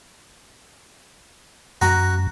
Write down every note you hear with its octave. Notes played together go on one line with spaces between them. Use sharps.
F#2 F#4 A#5